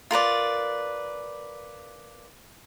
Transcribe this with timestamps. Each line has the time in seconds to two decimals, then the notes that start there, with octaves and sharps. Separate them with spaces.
0.11 F4 A#4 B4 D5